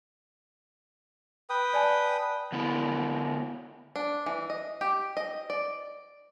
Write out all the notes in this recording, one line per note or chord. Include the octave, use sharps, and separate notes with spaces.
B4 G5 D#6
D5 G#5 A5
D3 B3 E4 A#4
D4
E3
D#5
G4
D#5
D5